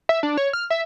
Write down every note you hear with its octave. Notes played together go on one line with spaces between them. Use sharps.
E5
D4
C#5
F6
E5